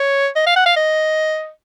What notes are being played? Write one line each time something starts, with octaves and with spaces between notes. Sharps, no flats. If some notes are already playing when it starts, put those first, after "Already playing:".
Already playing: C#5
D#5
F5
F#5
F5
D#5